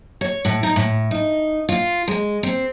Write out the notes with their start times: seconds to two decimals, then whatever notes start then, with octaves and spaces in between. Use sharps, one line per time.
0.21 C#5
0.45 A2
0.63 D#4
0.76 A2
1.11 D#4
1.69 F4
2.08 G#3
2.43 C4